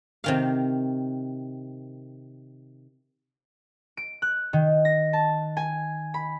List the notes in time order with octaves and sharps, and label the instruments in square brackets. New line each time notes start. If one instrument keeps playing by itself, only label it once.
[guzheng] C3 D#3 F5
[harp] D7
F#6
D#3
A#6
A5
G#5
B5